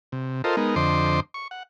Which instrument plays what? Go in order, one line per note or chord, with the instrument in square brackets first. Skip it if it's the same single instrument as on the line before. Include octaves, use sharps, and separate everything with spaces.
[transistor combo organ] C3
F4 A4 A#4 C5 D#5
G#3 B3 D#4 A#4
F2 D3 C5 D#5 C6 D6
C#6
F#5